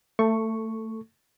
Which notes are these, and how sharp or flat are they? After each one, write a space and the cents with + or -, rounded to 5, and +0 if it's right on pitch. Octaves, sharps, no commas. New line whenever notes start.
A3 +20 A4 +0 C#6 +0